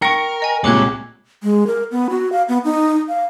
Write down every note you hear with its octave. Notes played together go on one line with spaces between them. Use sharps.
A#4 G5 C#6 A#6 C#7
D#5 G#5
C2 A#2 G#3 C#5 D6 F#6 G#6
G#3
A#4
B3
F#4
F5
B3
D#4
F5